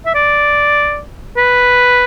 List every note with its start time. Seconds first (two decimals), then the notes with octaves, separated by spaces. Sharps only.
0.06 E5
0.15 D5
1.37 B4